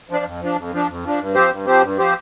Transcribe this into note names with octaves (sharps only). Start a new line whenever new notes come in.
F3 D4
F2
F3 D4
F2
F3 D4
F2
F3 D4
G2
F3 C4 G4 C5
G2
F3 C4 G4 C5
G2
F3 C4 G4 C5